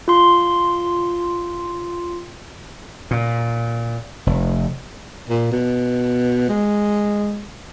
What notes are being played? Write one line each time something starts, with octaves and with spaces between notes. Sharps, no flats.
F4 C6
A#2
F1
A#2
B2
G#3